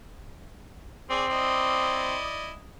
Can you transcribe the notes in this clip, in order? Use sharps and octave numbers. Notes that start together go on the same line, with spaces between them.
C4 G#4 D5
E4 D5 D#5